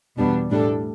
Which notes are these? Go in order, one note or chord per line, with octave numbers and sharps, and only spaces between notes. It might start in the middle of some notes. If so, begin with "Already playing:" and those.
E2 B2 G3 B3 D4
A2 G3 D4 A4